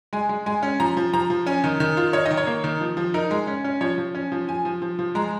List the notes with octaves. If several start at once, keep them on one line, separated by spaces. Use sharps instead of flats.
G#3 G#5
G#3
G#3 G#5
C#4
F3 A#5
F3
F3 A#5
F3
C#4 G#5
D#3
D#3
F4
D#4 C#5
D#3 D#5
C#5
A#3
D#3
F3
F3
D#4 A#4
G#3
C#4
C#4
F3 C#5
F3
C#4
F3
F3 G#5
F3
F3
F3
G#3 A#5